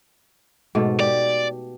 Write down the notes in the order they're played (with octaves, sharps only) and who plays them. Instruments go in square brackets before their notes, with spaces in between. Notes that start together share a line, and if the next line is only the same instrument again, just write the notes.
[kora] G#2 B2 A3
[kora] G4 [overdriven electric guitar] D5